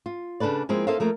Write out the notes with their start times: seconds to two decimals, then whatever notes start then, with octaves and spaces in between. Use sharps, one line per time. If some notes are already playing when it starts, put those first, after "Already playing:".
0.06 F4
0.40 C#3 D4 A4 B4 D5
0.69 F3 G#3 A#3 C4 E4
0.87 A#3 D#4 A4 C5 E5 F5
1.00 F3 A3 A#3 A#4